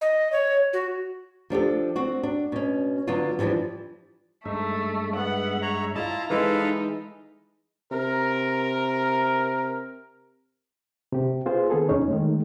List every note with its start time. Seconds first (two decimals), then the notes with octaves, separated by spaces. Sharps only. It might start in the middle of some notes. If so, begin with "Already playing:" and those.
0.01 D#5
0.32 C#5
0.73 F#4
1.50 F3 D4 G4 A4
1.96 C4 F#4
2.23 D4
2.52 B2 C#4
3.07 D3 F#3 B3 D4 F4
3.39 D3 E3 F3 G3 D4
4.45 G2 G#3 A3 D#4 E5
5.16 B3 F#5
5.62 C#5 A#5
5.95 E4 F4 D5 D#5 A5 A#5
6.30 E3 G#3 D#4 E4 A4 B4 F5
7.91 C3 A#4
11.12 C3 G4
11.46 B3 F4 G#4 C5
11.70 D#3 B3 G#4 A4
11.89 F2 B2 C#4 D#4 C#5
12.08 D#3 G#3 A3